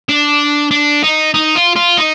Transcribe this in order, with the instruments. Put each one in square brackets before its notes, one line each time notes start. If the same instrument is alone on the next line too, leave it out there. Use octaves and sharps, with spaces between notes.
[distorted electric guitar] D4
D4
D#4
D#4
F4
F4
D#4